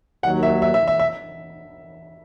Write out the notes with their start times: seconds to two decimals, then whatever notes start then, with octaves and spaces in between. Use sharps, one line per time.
0.23 D#2 D#3 F#3 F#5
0.43 E5
0.62 E5
0.74 E5
0.88 E5
1.00 E5